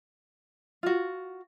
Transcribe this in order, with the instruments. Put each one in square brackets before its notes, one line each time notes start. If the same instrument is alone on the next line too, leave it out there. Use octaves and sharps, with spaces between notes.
[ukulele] F4 F#4